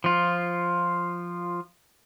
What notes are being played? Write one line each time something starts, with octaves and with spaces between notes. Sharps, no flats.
F3 F4